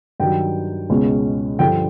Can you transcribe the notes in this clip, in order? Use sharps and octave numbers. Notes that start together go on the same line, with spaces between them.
G2 D#3 F#3 G5
C#2 B2 G#3 C#4
G2 D3 F3 G5